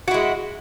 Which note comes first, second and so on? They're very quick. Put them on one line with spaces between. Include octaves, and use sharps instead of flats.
F#4 E4 G#3